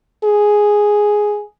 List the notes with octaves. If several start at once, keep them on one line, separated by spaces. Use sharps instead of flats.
G#4